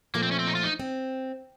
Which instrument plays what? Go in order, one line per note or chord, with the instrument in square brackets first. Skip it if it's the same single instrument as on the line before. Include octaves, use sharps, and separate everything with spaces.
[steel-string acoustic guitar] A#2 F3 A3 [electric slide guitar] A#3
[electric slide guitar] C4
C#4
C4
D#4
F4
D#4
[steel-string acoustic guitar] C4